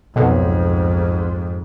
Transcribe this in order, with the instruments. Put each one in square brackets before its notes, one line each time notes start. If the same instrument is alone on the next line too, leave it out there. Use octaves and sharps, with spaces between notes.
[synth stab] B1 [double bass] F2 G#2